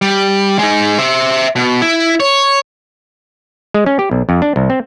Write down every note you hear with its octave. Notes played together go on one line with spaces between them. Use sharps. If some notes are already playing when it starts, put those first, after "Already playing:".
G3
G#3 D#4
C5 E5
B2
E4
C#5
G#3
C#4
G4
B1
F2
D4
C2
C4